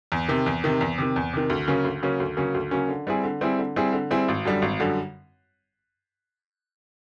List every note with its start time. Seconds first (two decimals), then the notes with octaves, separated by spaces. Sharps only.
0.12 E2
0.28 C3 D#3
0.46 E2
0.64 C3 D#3
0.81 E2
0.98 C3 D#3
1.16 E2
1.33 C3 D#3
1.50 D2
1.68 C#3 F#3 A#3 C#4
1.84 D2
2.03 C#3 F#3 A#3 C#4
2.20 D2
2.37 C#3 F#3 A#3 C#4
2.54 D2
2.71 C#3 F#3 A#3 C#4
2.88 D3
3.07 G3 C4 E4 G#4
3.24 D3
3.41 G3 C4 E4 G#4
3.59 D3
3.76 G3 C4 E4 G#4
3.93 D3
4.11 G3 C4 E4 G#4
4.28 G#1
4.45 F#2 D3 G3
4.62 G#1
4.80 F#2 D3 G3